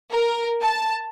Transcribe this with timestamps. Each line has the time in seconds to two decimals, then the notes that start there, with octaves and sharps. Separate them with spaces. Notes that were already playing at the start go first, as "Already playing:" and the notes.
0.12 A#4
0.62 A5